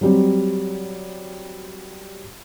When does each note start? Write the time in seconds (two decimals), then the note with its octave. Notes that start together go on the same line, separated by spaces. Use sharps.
0.01 F#3 G3 C4